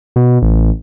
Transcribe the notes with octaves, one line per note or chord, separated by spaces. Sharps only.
B2
A1